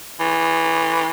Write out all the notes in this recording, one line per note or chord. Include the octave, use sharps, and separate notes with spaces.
E3